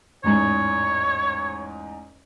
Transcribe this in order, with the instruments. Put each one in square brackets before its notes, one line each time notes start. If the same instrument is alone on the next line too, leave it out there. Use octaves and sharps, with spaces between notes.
[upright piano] A1 E2 G#2 [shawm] C#5